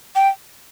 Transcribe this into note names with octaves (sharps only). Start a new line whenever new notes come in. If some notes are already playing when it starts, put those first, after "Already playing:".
G5